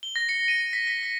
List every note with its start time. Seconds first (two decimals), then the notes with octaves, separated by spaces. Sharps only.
0.03 G7
0.16 A#6
0.29 C#7
0.48 D#7
0.73 B6
0.87 B6
1.03 B6